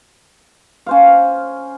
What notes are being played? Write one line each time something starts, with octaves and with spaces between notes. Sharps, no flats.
C#4 C5 F5